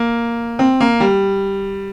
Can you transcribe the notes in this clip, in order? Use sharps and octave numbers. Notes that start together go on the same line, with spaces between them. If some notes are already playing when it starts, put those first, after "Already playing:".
Already playing: A#3
C4
A#3
G3